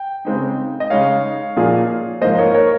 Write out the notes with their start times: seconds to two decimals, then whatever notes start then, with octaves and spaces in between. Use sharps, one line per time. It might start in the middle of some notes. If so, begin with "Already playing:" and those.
Already playing: G5
0.25 C#3 G#3 C4 D#4
0.80 D#5
0.90 C#3 G#3 D#4 C#5 F5
1.56 A#2 F3 A#3 F4 G#4
2.21 G#2 F3 A#3 C5 D#5
2.39 A#4 C#5
2.54 A#4 C#5